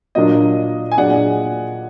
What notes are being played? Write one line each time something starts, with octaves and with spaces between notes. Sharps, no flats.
A#2 F#3 A#3 D4 D#5
G#5
A#2 F#3 D4 G#4 D5 F#5